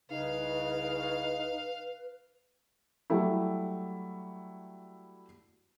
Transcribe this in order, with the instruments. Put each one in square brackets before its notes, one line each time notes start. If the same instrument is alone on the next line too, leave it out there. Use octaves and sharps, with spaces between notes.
[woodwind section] C2 C#3 [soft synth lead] D#4 [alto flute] B4 [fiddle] F5
[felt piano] F#3 G3 A3 E4